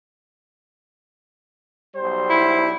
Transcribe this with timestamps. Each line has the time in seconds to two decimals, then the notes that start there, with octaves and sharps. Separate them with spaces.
1.96 B1 G3 C5
2.30 E4